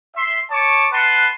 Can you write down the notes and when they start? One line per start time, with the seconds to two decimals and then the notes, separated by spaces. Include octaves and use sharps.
0.16 E5 C6
0.51 C#5 A5 C#6 D6
0.92 B4 F#5 A5 C6